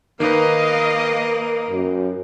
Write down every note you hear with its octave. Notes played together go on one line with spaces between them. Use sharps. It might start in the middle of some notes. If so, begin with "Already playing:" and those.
D#3 A#3 D#4 B4 D#5 F5
F#2